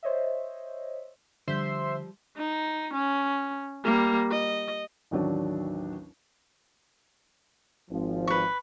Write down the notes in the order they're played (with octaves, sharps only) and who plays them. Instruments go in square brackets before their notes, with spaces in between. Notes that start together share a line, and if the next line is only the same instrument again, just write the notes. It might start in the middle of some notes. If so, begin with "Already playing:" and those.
[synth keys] C5 C#5 D#5 E5
[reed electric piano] D3 [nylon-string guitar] F3 G3 [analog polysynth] C5 E5 C6
[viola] D#4
C#4
G3 A#3
D#5
[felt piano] A1 D#2 F#3 D4 C#5
[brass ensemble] G#1 F3
[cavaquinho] B4 C#6